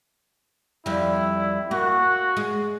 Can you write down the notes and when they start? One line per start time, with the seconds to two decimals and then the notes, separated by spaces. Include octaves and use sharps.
0.86 F2 G3 E4
1.71 A#3 F#4
2.37 G#3